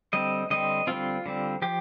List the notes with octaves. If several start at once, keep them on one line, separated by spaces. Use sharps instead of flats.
D3 G3 C4 D#5
D3 G3 C4 D#5
D3 G3 C4 F4
D3 G3 C4
F3 G4